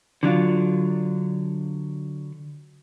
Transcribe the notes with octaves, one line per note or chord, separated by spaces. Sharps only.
D3 F#3 D4 F4